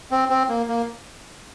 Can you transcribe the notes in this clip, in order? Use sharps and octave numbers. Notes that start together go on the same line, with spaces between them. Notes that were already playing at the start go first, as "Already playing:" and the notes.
C4
C4
A#3
A#3